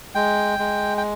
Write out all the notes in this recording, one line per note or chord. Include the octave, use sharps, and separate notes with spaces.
G#3 G5
G#3
G5